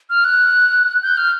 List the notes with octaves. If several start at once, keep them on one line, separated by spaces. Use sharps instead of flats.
F6
F#6
G6
F6